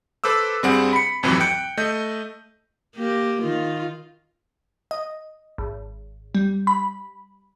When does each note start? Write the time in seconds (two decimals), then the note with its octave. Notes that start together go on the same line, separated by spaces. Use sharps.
0.24 A4 B4 C5 D6 E6
0.63 G2 G3 C4 G#4 F#5
0.93 B5 C#7
1.23 G#1 F2 A2 C3 E3 F#3
1.40 G5 F#6 G6 C#7 D7
1.77 A3 D#5 G6
2.96 A#3 G4
3.43 D#3 F4
4.91 D#5
5.58 G#1
6.35 G3
6.67 B5